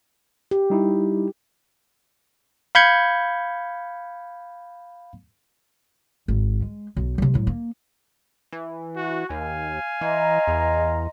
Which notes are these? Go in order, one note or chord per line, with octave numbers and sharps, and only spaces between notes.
G4
G3 D#4 E4
F5 B5 G6 G#6 C#7
G#1
G#3
B1
C3 F#3
A2 F#3
A#3
E3
F#4
D#2 F5 G#5
E3 D#5 A#5 C6
E2